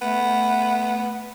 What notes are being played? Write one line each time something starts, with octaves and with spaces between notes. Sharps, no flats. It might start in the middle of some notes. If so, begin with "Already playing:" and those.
A3 B3